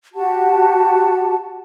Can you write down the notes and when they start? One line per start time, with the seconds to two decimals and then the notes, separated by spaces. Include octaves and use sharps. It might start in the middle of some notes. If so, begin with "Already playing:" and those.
0.14 F#4 G4 F#5 A5